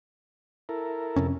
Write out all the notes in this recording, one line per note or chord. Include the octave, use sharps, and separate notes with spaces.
E4 A4 A#4
F2 C3 C#4